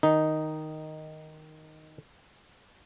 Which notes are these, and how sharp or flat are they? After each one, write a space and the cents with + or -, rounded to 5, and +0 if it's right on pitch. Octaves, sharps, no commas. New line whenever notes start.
D#3 +0 D#4 +0